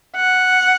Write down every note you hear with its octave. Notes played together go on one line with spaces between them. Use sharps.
F#5